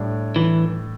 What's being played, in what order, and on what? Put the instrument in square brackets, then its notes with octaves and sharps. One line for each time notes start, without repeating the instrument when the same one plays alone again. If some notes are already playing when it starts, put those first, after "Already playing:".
Already playing: [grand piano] A2 G3 D4
[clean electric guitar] E3